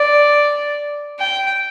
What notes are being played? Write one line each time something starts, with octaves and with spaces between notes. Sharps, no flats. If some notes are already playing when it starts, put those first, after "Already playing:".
Already playing: D5
G5